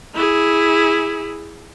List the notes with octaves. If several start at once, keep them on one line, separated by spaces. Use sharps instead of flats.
E4 G#4